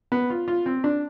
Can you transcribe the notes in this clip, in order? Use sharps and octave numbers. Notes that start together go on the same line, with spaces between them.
B3
F4
F4
C4
D4